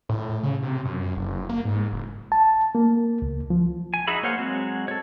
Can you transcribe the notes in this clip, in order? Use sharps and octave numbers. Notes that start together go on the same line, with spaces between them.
A2
C#3
C3
F#2
F#1
F#1
A#3
G#2
F#1
A5
A#3
C#2
F3
G#5
D#4 F#4 G#4 E5 B5
A#3 C5 C#5 F5 F#5
F#3 G#3 C4 F#4
A4 C#5